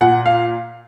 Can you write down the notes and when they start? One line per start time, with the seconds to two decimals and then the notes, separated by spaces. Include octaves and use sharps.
0.01 A#2 F#5
0.26 F5